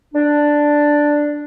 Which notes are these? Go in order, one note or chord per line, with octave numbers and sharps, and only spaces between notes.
D4